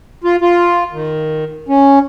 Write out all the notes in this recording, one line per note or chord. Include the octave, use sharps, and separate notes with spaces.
F4
F4
D#3
C#4